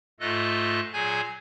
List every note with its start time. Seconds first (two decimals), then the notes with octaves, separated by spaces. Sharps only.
0.20 G#2 A3 F4 A4 D#5 F#6
0.93 A#2 F#3 G#4 G#5 G6 G#6